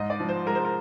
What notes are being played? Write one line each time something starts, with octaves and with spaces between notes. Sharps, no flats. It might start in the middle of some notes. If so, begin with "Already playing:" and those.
Already playing: G#2 D#5
D5
F3
C5
G#3 A#4
C5
A#4